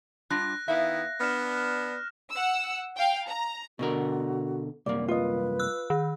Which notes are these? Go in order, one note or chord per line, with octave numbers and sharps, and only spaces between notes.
G3 D4 F4 F#6 A#6
D#3 B3 E4 E5 F5
B3 D4 F6 E7
F#5 E6
F5 G5
A#5
B2 D3 F#4 A#4
C2 F#2 A#3 D5
F4 B4 D#5
E6 F#6
D#3